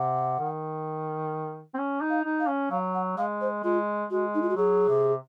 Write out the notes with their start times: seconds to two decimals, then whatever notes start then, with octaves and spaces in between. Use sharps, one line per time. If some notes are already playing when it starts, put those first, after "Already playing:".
Already playing: C3 F#5
0.39 D#3
1.74 C4
1.78 C#4
2.01 D#4
2.10 F5
2.24 D#4
2.40 F5
2.48 C#4
2.71 F#3 F5
2.95 F#5
3.17 G#3 F5
3.41 C5
3.64 G#3 F4
4.11 G#3 F#4
4.35 D#4
4.42 F4
4.49 F#4
4.56 F#3 G#4
4.88 C3